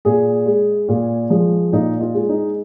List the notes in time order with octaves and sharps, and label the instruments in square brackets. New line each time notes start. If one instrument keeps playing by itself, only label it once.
[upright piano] A#2 G#4
G#3
A#2
F3 G#3
A#2 D#4
F4
G#3
D#4